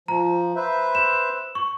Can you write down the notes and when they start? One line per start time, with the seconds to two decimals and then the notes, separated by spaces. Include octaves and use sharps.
0.08 F3 A#5
0.56 B4 C5 E5
0.95 E7
1.55 C#6